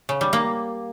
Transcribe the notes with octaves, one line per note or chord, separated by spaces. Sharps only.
C#3
G3
A#3